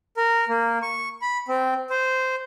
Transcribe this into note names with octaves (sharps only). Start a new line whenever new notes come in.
A#4
A#3
C#6
B5
C4
C5